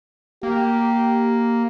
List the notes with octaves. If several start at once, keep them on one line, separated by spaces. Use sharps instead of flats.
A#3 G4